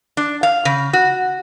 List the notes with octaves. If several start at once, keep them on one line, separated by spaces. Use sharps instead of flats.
D4
F5
C#3
F#4